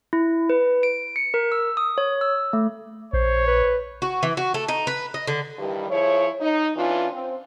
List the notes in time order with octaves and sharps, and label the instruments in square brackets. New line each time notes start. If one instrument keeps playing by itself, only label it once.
[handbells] E4
B4
D7
C#7
A#4
E6
D#6
C#5
E6
A3
[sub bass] A#1 [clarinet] C5 [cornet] C#5
[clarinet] B4
[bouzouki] F#4
E3
F#4
A3
D#4
B4
D#5
D3
[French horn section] G2 D#3 E3 G3
F3 E4 G#4 C#5
D#4
E3 C#4 D4 F4
C4